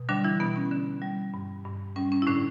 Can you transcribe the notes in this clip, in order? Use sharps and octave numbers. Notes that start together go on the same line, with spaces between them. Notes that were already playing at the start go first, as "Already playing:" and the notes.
Already playing: B2
D3 G3 D4
E3 E4
B2 B3
C#4
D3
G3
G2
G2
G3 C#4
C#4
E4
A2 D3 D4